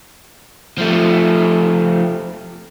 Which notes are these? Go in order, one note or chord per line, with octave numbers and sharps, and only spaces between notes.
F3 A3